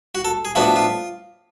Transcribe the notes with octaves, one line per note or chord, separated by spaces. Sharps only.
F#4
A4
G#4
A2 F3 B3 D4 F#4
F4